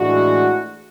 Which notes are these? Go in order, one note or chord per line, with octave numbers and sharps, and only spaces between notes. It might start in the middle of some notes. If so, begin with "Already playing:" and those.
Already playing: A2 E3 G#3 D4 F#4